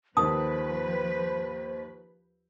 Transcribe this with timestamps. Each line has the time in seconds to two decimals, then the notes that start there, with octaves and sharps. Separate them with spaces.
0.17 D#2 D#3 F3 B4 C5 A5 D#6